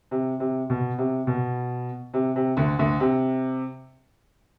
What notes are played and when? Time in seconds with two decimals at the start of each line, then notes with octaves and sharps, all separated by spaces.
0.11 C3
0.40 C3
0.70 B2
0.98 C3
1.27 B2
2.14 C3
2.36 C3
2.57 D2 D3
2.79 D2 D3
3.00 C3